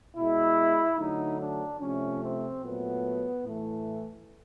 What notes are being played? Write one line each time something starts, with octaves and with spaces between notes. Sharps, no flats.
B2 G#3 E4
D3 F#3 A3 D#4
D4
C3 F3 A3 C#4
C4
A#2 F#3 A3 B3
A2 E3 A3